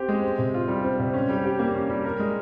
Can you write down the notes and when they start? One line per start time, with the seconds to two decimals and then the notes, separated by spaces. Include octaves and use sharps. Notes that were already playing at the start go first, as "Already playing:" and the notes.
Already playing: C4 G4
0.08 G#3
0.23 C4
0.38 C3
0.54 F4
0.68 G3
0.84 C4
0.99 C3
1.14 C#4
1.29 G3
1.44 G4
1.59 A#3
1.75 C#4
1.90 G3
2.05 A#4
2.19 G#3